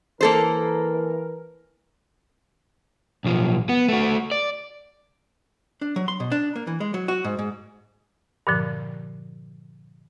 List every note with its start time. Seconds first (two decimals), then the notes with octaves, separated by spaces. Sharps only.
0.21 E3 A#3 A4 A#4 C5
3.25 B1 F3
3.69 B3
3.88 A3 F#4
4.31 D5
5.81 D4
5.96 F#3
6.08 C6
6.20 B2
6.32 D4
6.56 A#3
6.67 E3
6.80 G#3
6.94 F#3
7.08 F#4
7.25 G#2
7.39 G#2
8.47 G2 A#2 D3 F3